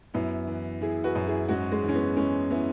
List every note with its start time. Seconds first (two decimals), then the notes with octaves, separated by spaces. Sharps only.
0.14 F#2 B3 E4
0.47 E3
0.81 E3 E4 G#4
1.04 F#4 B4
1.15 F#2
1.27 E4 G#4
1.49 G#2 C#4 F#4
1.72 G#3
1.83 E3
1.88 C#4
1.95 B3
2.16 E3 G#3 C#4
2.51 B3 E4